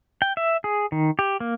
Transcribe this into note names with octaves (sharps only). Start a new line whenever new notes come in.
G5
E5
G#4
D#3
G4
A#3